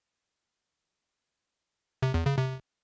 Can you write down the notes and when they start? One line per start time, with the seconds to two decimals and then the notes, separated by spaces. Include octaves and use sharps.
2.02 C3
2.14 E2
2.26 C#3
2.38 C3